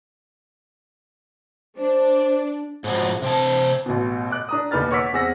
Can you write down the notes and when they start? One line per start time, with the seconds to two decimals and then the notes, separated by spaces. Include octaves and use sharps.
1.78 D4 C5
2.84 G#2 B2 F3 F#3
3.22 C3 C4 A5
3.86 A1 B2
4.30 D#5 D6 F#6
4.49 D4 A#5 D#6
4.71 E1 D#2 D#4 B4 F6 A6
4.91 C#5 F#5 C#6 D6 E6 B6
5.13 E2 C4 G#4 F#5 E6 A#6